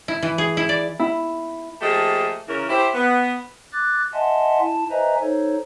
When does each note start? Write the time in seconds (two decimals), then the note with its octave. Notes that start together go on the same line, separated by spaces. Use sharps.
0.08 E4
0.23 E3
0.38 G#4
0.57 E4
0.69 D5
0.99 E4
1.82 F3 A3 A#3 G4 G#4 D#5
2.48 C#3 E3 C#4 A#4
2.69 E4 G4 C5
2.94 B3
3.73 D6 F#6 A6
4.13 D#5 E5 F#5 G#5 A5 C6
4.60 E4 A5
4.91 B4 C5 D#5 E5 G#5 A#5
5.22 D#4 A4 C5 C#5